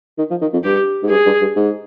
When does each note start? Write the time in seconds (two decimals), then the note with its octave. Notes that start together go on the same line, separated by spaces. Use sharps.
0.18 D#3
0.30 F3
0.41 D#3
0.53 F2
0.64 G2 G4
1.03 G#2
1.10 G2 G#4
1.26 G2
1.41 G2
1.56 G#2